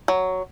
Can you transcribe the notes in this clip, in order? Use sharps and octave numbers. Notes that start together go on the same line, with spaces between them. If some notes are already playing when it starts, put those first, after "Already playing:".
F#3